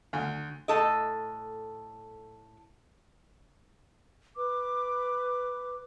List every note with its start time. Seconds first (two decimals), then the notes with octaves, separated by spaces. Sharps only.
0.13 D2
0.68 A2 A4 D#5
4.37 B4 D6